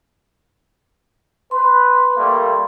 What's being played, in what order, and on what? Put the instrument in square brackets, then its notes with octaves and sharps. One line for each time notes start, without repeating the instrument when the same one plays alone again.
[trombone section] B4 [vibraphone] C6
[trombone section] G3 A3 A#3